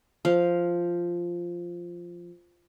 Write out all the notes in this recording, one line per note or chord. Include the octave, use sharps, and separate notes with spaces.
F3 F5